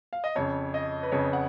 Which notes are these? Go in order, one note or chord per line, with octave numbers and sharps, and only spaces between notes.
F5
D#5
F2 C#3 C#5
D#5
B4
F2 C#3 C#5
F#5